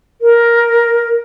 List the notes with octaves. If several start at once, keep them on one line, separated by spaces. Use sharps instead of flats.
A#4